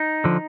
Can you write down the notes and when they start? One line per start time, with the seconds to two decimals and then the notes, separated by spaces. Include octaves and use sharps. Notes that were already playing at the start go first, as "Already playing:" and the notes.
Already playing: D#4
0.24 D3 F3